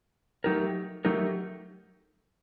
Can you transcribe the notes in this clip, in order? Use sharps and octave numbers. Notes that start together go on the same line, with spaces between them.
F#3 A3 D#4 G4 A#4
F#3 A3 D#4 G4 A#4